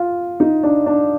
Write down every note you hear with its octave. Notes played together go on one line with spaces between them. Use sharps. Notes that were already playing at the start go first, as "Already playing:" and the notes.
Already playing: F4
D#4
D4
D4